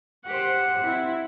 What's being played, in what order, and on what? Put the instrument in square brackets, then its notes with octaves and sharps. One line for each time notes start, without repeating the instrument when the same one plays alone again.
[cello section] G4 C5 [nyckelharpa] F#5
[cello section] C4 E4